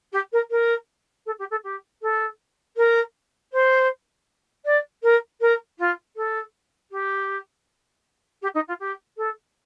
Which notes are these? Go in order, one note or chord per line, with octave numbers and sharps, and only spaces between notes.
G4
A#4
A#4
A4
G4
A4
G4
A4
A#4
C5
D5
A#4
A#4
F4
A4
G4
G4
D#4
F4
G4
A4